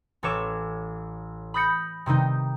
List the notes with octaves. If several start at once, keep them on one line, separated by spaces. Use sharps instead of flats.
A1 A4 C#5 D6 E7
B5 D#6 G6 A#6 C#7
C3 D#3 G3 D#4